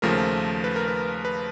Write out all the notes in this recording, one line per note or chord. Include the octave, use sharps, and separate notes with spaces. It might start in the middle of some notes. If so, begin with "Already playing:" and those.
D#2 C#3 F3 A3 A#4
B4
A#4
B4
B4